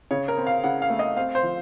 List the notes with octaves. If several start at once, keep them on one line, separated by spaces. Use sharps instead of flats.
C#3 C#5
A#4
C4
F5
C#3 F#5
F5
A3
D#5
C4 F5
C5
F3